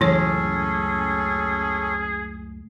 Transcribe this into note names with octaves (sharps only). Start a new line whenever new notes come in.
C#2 F#2 A2 E3 C#4 G#4 A4 C#5